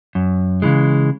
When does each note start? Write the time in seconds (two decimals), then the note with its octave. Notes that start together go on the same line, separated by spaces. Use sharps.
0.15 F#2
0.62 C#3 E3 G#3